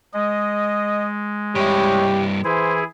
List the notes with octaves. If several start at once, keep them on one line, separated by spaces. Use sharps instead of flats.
G#3 D#5
G2 E4 G4 C#5
E3 E4 G#4 C5